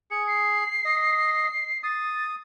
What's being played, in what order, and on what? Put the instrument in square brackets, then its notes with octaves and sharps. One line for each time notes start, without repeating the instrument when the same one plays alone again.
[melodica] G#4 [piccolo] C#7
[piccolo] C7
[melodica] D#5
[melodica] D#6 [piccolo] A6